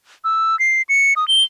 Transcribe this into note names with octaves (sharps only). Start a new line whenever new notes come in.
E6
C7
C#7
D#6
G7